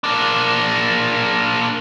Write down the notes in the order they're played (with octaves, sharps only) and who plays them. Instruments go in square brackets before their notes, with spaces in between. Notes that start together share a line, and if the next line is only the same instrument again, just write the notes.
[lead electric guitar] A#3 D4